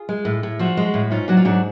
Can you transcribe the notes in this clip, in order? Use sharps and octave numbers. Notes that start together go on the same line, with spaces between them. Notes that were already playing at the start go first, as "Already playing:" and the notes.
Already playing: F4 G#4
G#3
A2
A2
F3 D4 F#4
G#3
A2
G#2 C#4 F4
F#3 D4 F#4
F4
G#2 D4 F#4